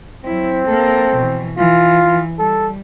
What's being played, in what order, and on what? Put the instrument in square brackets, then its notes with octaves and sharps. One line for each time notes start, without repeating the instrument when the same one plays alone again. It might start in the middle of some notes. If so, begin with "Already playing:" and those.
[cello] F#3 E4 [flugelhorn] C4
[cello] A#3 A4
B2 E3
[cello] E3 [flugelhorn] F4
[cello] G3 [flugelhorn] A4